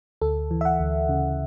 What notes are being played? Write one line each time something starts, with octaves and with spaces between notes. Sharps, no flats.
D2 A4
E3
E5
F#5
D2
C#3